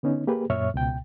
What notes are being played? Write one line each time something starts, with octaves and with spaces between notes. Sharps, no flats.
D3 B3 C#4 D#4
A#3 G4 G#4 B4
F#2 A#2 C#5 E5 C#6 F6
C#2 B2 G5